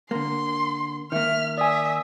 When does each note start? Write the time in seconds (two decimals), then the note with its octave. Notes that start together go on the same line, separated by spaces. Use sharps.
0.11 D3 A#3 C6
1.12 D#3 A#3 E5 F6
1.58 D5 E5 G#5 D#6